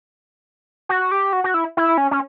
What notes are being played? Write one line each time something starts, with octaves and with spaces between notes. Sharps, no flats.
F#4
G4
F#4
F#4
E4
E4
C#4
C#4